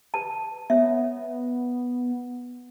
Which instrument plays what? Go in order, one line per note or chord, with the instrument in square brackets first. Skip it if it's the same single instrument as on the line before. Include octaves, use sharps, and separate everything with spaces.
[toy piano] B4 A5
[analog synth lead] B3 [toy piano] C#5 E5